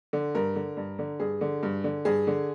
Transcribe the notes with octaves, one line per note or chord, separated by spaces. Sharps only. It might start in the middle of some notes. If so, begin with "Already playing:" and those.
D3
G2 A#4
D3
G2
D3
G2 G#4
D3
G2
D3
G2 G#4
D3